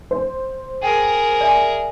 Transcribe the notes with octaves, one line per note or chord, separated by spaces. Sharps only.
C5
G#4 A#4 G5
D5 E5 G#5